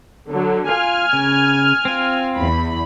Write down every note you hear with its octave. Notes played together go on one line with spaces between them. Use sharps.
D3 F#3
F4 G#5 F6
C#3
C4 F4
E2 B5